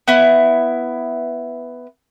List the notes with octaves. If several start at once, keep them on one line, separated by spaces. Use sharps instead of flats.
B3 E4